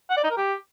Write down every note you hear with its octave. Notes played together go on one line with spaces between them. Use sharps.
F#5
D5
D#4
A#4
G4